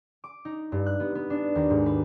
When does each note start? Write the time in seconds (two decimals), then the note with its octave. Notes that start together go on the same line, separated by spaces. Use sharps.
0.24 D6
0.45 D#4
0.72 G2
0.86 F#6
1.00 B3
1.15 B3
1.30 D4
1.55 D#2
1.70 G#2
1.86 B4